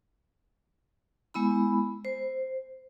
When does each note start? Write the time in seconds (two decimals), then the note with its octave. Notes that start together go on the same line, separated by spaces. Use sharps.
1.34 G#3 B3 E4 B5
2.05 C5